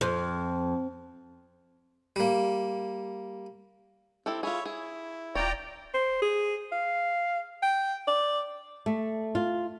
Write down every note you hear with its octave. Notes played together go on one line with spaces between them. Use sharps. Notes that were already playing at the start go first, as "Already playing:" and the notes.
F2
G3 A#3
C4 E4 G4 A4
F4 G#4 C#5 E5 B5
E4 G#4
D#1 F4 C#5 D5 G5 A#5
C5
G#4
F5
G5
D5
A3
F4